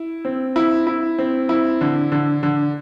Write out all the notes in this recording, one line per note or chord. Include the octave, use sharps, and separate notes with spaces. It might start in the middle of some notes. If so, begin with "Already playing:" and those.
Already playing: E4
C4
E4
E4
C4
E4
D3
D3
D3